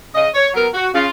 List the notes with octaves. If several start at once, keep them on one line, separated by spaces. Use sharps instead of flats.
C#3 D#5
C#5
F#3 B3 A#4
F#4
C#3 F4